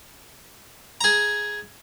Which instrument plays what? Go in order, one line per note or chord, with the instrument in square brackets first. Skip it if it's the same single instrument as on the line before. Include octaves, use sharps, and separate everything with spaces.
[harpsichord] G#4 A#5